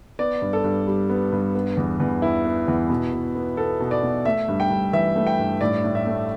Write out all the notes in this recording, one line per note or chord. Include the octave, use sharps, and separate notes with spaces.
B3 D5
G2
A4
G2
G3
B3
G2
B3
E2
E2
E3 E4
B3
E2
B2
B2
B3
B3 A4
B2
D5
B2
A3 E5
G2
G5
G2
E3 E5
A3
G5
G2
A2 D5
A2
E5
A3